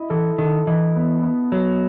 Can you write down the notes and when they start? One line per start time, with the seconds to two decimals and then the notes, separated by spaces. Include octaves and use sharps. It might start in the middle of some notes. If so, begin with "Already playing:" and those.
Already playing: E4 D#5
0.10 E3 A4
0.38 D#3 A4
0.67 E3 D#5
0.95 B3
1.23 B3
1.52 F#3 B3